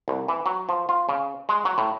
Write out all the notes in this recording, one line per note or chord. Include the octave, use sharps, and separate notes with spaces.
C2
E3
F#3
F3
F4
C#3
G#3
F#3
A2